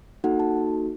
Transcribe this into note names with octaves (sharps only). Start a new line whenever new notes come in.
A#3 D#4 F#4 A4 F#5
A5